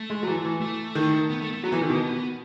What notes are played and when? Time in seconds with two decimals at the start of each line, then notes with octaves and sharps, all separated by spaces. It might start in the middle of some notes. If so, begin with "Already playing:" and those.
Already playing: A3
0.10 G#3
0.23 F#3
0.27 E3
0.45 E3
0.61 A3
0.95 D#3
1.30 B3
1.41 A3
1.53 A3
1.64 F#3 B3
1.72 E3
1.81 D#3
1.90 B2